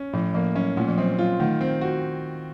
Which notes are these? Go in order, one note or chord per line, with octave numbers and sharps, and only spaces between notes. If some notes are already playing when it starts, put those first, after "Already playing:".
Already playing: C#4
A2 F3
F3 A#3
F#3 C#4
A#2 A3
F3
F#3 C4
F#3 F4
D#3 A3
C4
F#4